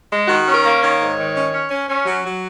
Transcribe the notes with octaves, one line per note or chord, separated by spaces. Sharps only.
G#3
D#3 F#4
C#4
A#4
A#3
D#3 C#5
G#2
D#3
C#4
C#4
C#4
C#4
F#3
F#3